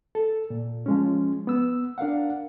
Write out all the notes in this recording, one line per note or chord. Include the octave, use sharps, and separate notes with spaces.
A4
A#2
F3 G#3 C#4
B3 E6
D4 A#4 F5 F#5